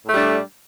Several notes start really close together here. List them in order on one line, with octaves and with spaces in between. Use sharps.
A2 A3 G3 D4